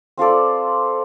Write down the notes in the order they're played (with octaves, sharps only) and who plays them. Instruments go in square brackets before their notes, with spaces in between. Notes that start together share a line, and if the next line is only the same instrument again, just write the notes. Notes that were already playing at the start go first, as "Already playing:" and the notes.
[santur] C4 F4 A4 D5